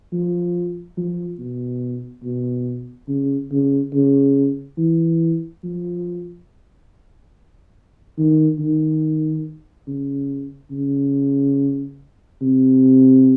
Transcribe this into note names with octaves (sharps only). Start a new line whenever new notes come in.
F3
F3
B2
B2
C#3
C#3
C#3
E3
F3
D#3
D#3
C#3
C#3
C3